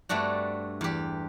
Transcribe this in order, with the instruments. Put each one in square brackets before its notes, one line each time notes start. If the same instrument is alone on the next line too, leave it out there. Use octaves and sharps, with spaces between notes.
[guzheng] G2 A3 C4 D4 F#4
E2 G4